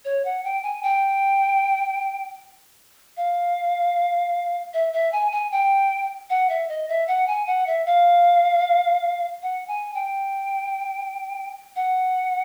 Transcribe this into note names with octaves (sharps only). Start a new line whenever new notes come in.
C#5
F#5
G5
G#5
G5
F5
E5
E5
G#5
G#5
G5
F#5
E5
D#5
E5
F#5
G#5
F#5
E5
F5
F#5
G#5
G5
F#5